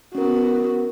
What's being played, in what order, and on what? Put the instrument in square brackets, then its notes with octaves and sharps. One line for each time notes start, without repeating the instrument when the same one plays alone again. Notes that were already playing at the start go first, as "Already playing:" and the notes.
[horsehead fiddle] B3 F#4 [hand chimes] C#4 A#4